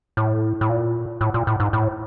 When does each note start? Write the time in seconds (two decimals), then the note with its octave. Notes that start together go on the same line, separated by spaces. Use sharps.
0.17 A2
0.61 A2
0.69 A#2
1.21 A2
1.34 A#2
1.47 A2
1.60 G#2
1.73 A2